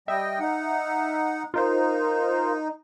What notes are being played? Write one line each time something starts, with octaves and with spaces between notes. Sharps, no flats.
G3 D#5 E5 G5
D#4 F#5
D#4 F4 A#4 C5